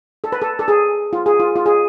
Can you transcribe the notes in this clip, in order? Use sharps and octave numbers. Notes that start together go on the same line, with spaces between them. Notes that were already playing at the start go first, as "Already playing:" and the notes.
A4
B4
A4
A4
G#4
F4
G#4
F4
F4
G#4